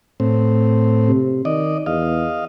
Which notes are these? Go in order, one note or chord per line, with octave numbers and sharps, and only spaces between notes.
A2 C4
C3
D#3 D5 D#5
E2 D#5 F5